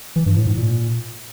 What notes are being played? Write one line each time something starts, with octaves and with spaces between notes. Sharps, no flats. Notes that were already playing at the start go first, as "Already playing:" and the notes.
E3
G2
A2
G#2
A#2